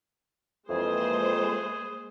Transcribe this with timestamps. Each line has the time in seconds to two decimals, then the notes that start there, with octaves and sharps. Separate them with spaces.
0.69 F2 E3 G#3 A#3 G#4 C5